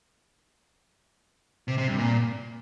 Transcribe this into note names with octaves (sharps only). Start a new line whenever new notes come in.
C3
C3
G2
A#2